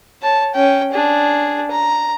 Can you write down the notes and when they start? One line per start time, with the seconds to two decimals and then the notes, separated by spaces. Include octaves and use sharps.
0.22 C#5 A5
0.54 C#4 G5
0.93 D4 G#4
1.71 A#5